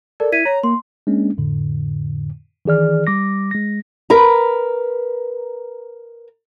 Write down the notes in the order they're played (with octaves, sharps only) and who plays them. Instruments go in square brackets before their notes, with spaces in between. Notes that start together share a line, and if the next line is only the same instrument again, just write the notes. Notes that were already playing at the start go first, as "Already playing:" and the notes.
[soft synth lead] A4 [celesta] A#4 D5
[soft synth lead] E4 [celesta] G#6 B6 D#7
[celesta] C#5 [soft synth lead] A#5
[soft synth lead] A#3 [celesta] C6
[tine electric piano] G#3 A#3 C#4 D4
F2 A2 D3
D#3 E3 G#4 D5 F6
G3 D6 A#6
G#3 A#6
[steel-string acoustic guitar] A#4 B4 A#5